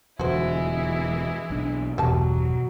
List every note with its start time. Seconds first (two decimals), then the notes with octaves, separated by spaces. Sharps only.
0.19 E1 F2 D3 E3 G#3 E4 F#4 C5
1.50 B1 D4
1.98 G1 E2 B2 F#3 G3 A5